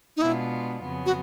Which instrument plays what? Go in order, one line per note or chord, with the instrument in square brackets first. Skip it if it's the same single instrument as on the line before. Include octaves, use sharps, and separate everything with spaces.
[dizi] D#4
[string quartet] B2 G#3 B3 D4 F4 [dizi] E4
[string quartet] F2 C#3 F#3 B3
[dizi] F#4